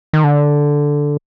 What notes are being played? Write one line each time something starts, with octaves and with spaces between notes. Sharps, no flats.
D#3
D3